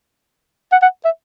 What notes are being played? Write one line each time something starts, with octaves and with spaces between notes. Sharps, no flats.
F#5
F#5
E5